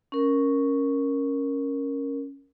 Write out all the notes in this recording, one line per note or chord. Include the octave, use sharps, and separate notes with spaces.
C#4 A#4